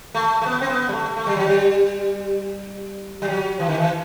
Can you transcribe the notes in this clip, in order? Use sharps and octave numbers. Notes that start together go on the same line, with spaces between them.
A3
A3
B3
C4
B3
G3
A3
A3
G3
F#3
G3
G3
F#3
E3
D#3
E3